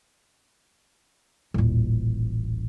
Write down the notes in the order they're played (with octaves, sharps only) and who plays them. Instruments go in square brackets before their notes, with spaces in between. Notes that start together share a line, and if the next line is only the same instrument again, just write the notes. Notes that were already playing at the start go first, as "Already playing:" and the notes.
[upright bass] D#1 A1